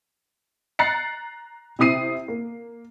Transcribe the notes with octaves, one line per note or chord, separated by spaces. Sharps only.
A#5 F#6 A6 C7 C#7
C3 C4 E4 D#6 C7 D#7
A#3